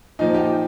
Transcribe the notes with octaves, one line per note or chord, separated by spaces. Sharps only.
A#2 F3 D#4
G4